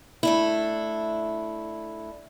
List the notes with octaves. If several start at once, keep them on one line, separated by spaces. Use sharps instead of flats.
A3 D4 E4